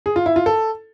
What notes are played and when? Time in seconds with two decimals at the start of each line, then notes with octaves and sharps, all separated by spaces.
0.06 G#4
0.16 F4
0.26 E4
0.36 F4
0.46 A4